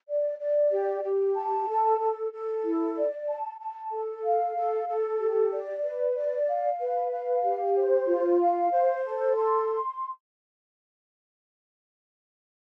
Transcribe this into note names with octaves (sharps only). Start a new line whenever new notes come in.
D5
D5
G4
G4
A5
A4
A4
A4
E4
D5
A5
A5
A4
F5
A4
A4
G4
D5
B4
D5
F5
B4
F5
G4
C5
F4
F5
C5
A4
C6